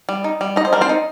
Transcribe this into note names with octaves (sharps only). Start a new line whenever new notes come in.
G3
D#4
G3
D#4 D#5
C5
G3 A#4
C4 C5
D#4